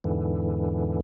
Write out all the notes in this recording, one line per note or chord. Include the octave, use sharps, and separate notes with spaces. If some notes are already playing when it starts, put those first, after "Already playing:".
E2 G#2 D3 E3